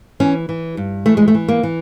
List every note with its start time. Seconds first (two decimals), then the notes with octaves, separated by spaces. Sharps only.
0.20 E3 C#4
0.49 E3
0.77 G2
1.06 E3 A3
1.17 G#3
1.28 A3
1.35 E3
1.48 A#3
1.63 E3